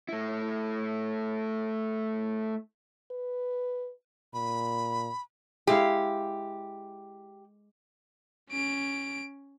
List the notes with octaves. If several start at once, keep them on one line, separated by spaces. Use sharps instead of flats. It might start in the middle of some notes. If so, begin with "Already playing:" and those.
A3 E4
B4
A#2 B5
G#3 E4 G4 F5
C#4 D7